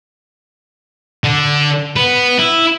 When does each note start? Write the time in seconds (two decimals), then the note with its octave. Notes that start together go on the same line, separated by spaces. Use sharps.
1.24 D3
1.96 B3
2.38 E4